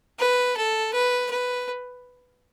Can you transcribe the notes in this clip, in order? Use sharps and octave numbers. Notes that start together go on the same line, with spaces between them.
B4
A4
B4
B4